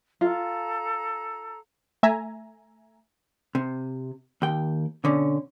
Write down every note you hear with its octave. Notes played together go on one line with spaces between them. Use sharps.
F4 A4 A#5
A3 E5 G#5 A#5
C3
D#2 G5
B2 D3 C#4